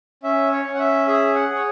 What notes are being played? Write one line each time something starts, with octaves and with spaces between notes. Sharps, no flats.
C#4 E5
C#5
C#4
F#5
E5
G#4 E5
F#5
G#4
C#5